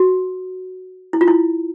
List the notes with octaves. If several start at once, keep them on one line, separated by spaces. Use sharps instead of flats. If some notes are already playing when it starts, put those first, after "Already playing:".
Already playing: F#4
E4
F4
E4